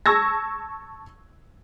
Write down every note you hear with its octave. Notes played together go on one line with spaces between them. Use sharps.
A5 C#6 E6 G#6 A#6